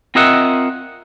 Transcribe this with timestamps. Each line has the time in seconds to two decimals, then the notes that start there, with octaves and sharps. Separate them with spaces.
0.15 C4 F4 A#4 D#5 E5 F#5